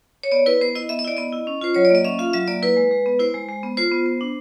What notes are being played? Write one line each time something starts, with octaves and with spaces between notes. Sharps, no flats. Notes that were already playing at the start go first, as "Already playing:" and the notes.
C#5
B3 D5
E4 B4
B3 C5
E4 D#5
B3 E5
D#5
E4 D5
B3 D#5
E4
C#4
F4 C5
F#3 C#5
D5
A#3 D#5
C#4 E5
F4 F5
F#3 E5
A#3 D5
E4 B4
G#3
G#3
B3
E4 C5
G#3
G#3
B3
F4 C5
B3
B3
D4